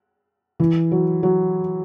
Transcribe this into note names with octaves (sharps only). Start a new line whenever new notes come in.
E3
F#3
F#3